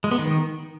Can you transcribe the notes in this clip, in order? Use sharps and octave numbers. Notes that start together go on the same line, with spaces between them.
G#3
B3
D#3